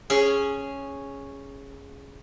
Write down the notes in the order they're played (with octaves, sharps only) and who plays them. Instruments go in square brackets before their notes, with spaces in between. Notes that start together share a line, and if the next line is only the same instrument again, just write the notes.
[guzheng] C#4 G#4